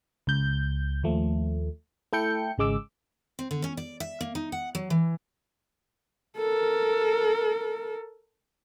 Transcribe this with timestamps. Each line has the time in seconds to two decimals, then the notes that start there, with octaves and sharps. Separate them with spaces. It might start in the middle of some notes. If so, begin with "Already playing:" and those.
0.27 C#2 G6
1.03 D#2 F3 A3
2.13 A3 E4 A4 G5 G6 C#7
2.58 G#1 C#3 G#3 D6 E6
3.39 C4
3.51 D3
3.64 C#4
3.77 D5
4.00 E5
4.21 A#3
4.35 D#4
4.52 F#5
4.75 F#3
4.90 E3
6.38 A4 A#4